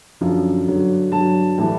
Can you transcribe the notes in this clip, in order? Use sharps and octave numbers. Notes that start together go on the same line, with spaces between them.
F#2 D3 F3
G2 D3 F#3
G2 D3 F#3 A5
A2 E3 G3 A5